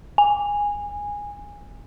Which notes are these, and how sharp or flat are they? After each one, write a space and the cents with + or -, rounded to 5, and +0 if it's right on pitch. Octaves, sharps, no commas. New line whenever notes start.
G#5 -15